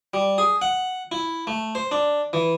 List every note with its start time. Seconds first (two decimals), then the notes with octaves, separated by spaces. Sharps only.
0.14 G3
0.38 G#4
0.62 F#5
1.12 E4
1.47 A3
1.75 C5
1.91 D4
2.33 E3